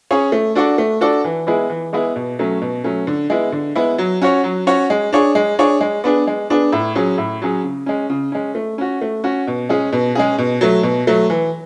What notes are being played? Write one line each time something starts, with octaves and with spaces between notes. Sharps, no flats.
C#4 G#4 C#5
A3
D4 F#4 A4 D5
A3
D4 F#4 A4 D5
E3
G#3 B3 E4 G#4
E3
G#3 B3 E4 G#4
B2
F#3 A3 C#4
B2
F#3 A3 C#4
D3
G#3 B3 E4
D3
G#3 B3 E4
F#3
C#4 F#4 C#5
F#3
C#4 F#4 C#5
G#3
D4 G#4 C#5
G#3
D4 G#4 C#5
G#3
B3 D4 G#4
G#3
B3 D4 G#4
A2
F#3 C#4 G#4
A2
F#3 C#4 G#4
C#3
G#3 C#4
C#3
G#3 C#4
A3
C#4 F#4
A3
C#4 F#4
B2
G#3 C#4 G#4
B2
G#3 C#4 G#4
B2
F#3 A3
B2
F#3 A3
E3